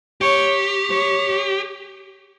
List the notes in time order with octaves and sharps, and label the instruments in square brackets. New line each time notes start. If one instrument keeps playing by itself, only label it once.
[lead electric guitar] G4 [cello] C#5
[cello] C#5